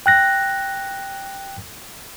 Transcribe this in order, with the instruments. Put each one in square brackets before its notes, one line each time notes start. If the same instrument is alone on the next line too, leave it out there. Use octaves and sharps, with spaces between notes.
[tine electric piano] G5 F#6 A#6